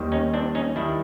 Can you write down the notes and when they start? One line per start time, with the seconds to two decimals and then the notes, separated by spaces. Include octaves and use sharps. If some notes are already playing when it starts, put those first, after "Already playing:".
Already playing: D#2 D#3 G3
0.12 C#4 D#4
0.34 C4 D4
0.55 C#4 D#4
0.76 D#3 G3 D4 E4